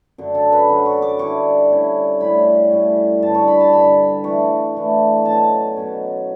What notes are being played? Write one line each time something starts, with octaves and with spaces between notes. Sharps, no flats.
F#2 D3 F#3
A4
B4
F#2 D3 F#3 F#5
C#6
D6
D3 G3 C#4 E4 C#6
D3 G3 C#4 E4
A2 G3 C#4 B5
A2 G3 C#4
G2 D3 G3 A5
C#6
B5
A5
G2 D3 G3 B5
E3 A3 D4 C#6
E3 A3 D4
B2 F#3 C#4 A5
B2 F#3 C#4